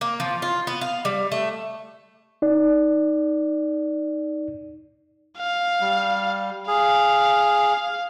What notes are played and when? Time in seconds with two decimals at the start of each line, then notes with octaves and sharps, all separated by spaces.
0.01 A#3
0.20 F3
0.42 F4
0.67 B3
0.81 F5
1.05 G3
1.32 A3
2.42 D#4 D5
5.38 F5
5.81 G3
6.68 G#4 F5